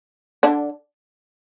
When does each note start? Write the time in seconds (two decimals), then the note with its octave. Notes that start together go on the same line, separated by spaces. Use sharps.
0.43 D3 D4